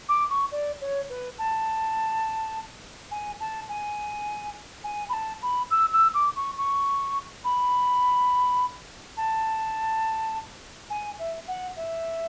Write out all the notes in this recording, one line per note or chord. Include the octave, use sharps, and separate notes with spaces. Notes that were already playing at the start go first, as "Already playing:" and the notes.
D6
C#6
D5
C#5
B4
A5
G#5
A5
G#5
G#5
B5
A5
B5
E6
E6
D6
C#6
C#6
B5
A5
G#5
E5
F#5
E5